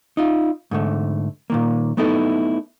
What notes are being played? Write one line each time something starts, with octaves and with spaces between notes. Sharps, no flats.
D#4 F4
G#2 D3 A3
A#2 D#3 A#3
A3 B3 D#4 E4 A4